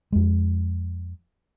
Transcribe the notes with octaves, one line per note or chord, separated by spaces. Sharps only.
F2 G#3